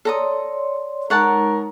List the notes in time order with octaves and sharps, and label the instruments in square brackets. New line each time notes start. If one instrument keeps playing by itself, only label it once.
[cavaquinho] A4 A#5 D#6 [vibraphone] C#5 D5 C6
[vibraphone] G#3 D#4 [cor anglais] A#4 [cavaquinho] C#5 F#5 A5